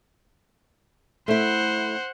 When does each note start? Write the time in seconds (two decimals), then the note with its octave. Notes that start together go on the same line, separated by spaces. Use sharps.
1.28 A3 E4 C5 F#5